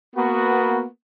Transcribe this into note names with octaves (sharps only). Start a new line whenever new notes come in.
A#3 B3 F#4